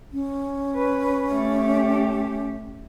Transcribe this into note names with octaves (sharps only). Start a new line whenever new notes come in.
C#4
B4
A3 G4